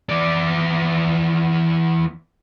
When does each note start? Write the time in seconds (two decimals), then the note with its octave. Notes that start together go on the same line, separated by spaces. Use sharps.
0.10 E2 D5